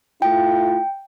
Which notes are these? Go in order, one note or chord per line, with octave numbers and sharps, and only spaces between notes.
A3 E4 F4 G5